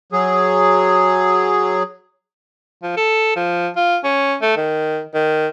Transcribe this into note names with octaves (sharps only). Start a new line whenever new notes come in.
F#3 G#4
F3
A4
F3
F4
C#4
A3
D#3
D#3